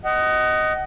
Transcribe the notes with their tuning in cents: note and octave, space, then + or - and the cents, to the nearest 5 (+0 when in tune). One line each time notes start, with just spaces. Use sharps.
D#5 +0 F#5 +30